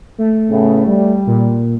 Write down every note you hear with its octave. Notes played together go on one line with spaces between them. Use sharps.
A3
A2 C#3 B3
G3
A#2